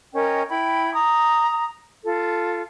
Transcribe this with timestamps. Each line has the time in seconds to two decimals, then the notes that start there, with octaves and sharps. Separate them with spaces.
0.14 C#4 A#4 D#5 G5
0.50 E4 G5 B5
0.94 A#5 D#6
2.04 F4 A4